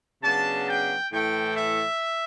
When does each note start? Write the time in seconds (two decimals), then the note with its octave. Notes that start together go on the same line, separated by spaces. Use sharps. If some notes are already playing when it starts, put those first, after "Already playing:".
0.23 C#3 F#3 B3 D4 A5
0.67 G5
1.11 A2 E3 A3 G5
1.56 E5